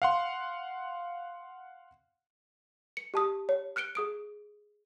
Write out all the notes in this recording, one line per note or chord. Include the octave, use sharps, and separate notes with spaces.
F5 F#5 C6
C#7
G4 A5 D#6
C#5
F6 F#6 C#7 D7 G7
G#4 D#6 D7